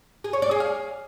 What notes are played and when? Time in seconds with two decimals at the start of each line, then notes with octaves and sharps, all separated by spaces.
0.24 G#4
0.33 C#5
0.42 D5
0.51 G#4
0.60 F5